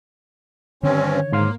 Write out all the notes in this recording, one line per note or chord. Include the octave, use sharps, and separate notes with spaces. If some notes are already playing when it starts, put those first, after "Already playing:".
G2 D3 D#3 C4 C#4 C#5
G#2 A#3 C6 F6